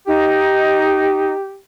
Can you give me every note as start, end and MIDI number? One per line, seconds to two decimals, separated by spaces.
0.07 1.34 63
0.07 1.58 67